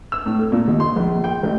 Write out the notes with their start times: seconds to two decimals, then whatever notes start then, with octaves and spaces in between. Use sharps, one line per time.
0.12 E6
0.26 A2
0.39 A4
0.52 A#2
0.68 D#2
0.80 C6
0.96 A#1
1.24 G5
1.43 A1